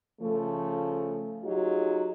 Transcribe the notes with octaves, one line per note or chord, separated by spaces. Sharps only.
C#3 F3 A3
F#3 D#4 F4 G4 G#4